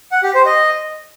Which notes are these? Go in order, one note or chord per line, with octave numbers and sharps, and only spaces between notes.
F#5
G4
C5
D#5